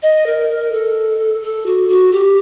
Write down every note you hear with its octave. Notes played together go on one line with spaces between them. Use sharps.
D#5
A#4
A#4
A4
A4
F#4
F#4
G4